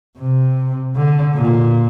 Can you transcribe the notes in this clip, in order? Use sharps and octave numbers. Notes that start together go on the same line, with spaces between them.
C3
D3
A#2